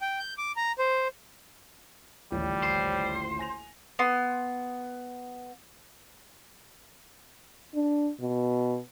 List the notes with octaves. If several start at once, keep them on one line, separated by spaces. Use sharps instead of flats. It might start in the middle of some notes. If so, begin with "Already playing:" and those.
G5
G6
D6
A#5
C5
D#1 A1 D2 G3
C5
G#5 A#6 F7
B3 C6
D4
B2